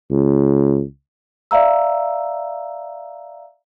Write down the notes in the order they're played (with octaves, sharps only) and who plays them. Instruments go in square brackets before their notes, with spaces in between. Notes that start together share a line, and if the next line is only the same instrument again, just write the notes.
[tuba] C#2
[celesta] D5 E5 F5 A#5 E6